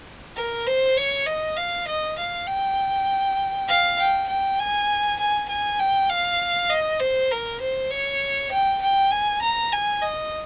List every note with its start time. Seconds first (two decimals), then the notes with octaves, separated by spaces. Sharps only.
0.36 A#4
0.67 C5
0.97 C#5
1.26 D#5
1.57 F5
1.87 D#5
2.18 F5
2.47 G5
3.68 F5
3.99 G5
4.28 G5
4.59 G#5
5.19 G#5
5.49 G#5
5.79 G5
6.09 F5
6.70 D#5
7.00 C5
7.31 A#4
7.61 C5
7.91 C#5
8.51 G5
8.82 G5
9.11 G#5
9.41 A#5
9.72 G#5
10.02 D#5